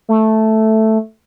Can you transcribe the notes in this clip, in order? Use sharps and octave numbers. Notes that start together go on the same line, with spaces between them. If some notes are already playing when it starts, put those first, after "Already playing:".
A3